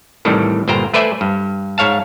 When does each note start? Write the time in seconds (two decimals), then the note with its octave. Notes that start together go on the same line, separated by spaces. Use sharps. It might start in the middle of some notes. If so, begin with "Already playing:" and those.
0.25 C2 A2 D#3 E3 G3
0.68 G1 A#2 C5 G5 A#5
0.94 A3 B4 C5 D5 E5 G#5
1.21 G2
1.78 G#2 C#5 F5 A5